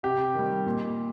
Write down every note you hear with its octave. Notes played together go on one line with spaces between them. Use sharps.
C3 G4
D#3 G3
A#2